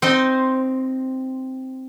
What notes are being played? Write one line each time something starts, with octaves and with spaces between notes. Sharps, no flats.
C4 D#4 C5